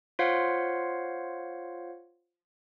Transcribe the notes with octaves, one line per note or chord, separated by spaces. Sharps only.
F4 C5 C#5 F5 F#5